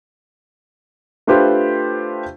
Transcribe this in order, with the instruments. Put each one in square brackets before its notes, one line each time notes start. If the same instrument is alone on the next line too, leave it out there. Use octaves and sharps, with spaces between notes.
[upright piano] A3 D4 F4 G4 B4 C5